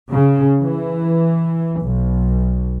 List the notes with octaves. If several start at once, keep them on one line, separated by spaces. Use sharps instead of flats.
C#3
E3
B1